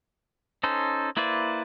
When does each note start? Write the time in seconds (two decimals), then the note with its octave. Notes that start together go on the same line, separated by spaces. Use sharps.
0.63 C#4 D#4 A4 C5
1.17 A#3 E4 B4 C5 D5